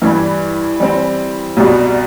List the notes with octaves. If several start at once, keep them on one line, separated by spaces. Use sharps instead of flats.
G2 E3 G3
E3 G3 C4
C2 B2 G3